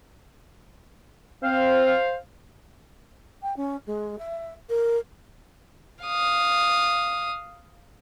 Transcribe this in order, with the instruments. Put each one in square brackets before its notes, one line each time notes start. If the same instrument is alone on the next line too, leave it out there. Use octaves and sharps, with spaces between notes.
[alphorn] C4 [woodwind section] C5 F5
[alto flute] G5
C#4
G#3
E5
A#4
[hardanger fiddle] F5 D#6